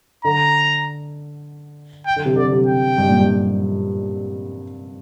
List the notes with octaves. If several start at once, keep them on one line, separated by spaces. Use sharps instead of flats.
D3 A#5
G5
D3
C3
D3 D5
C3
G5
G2
A#2
G2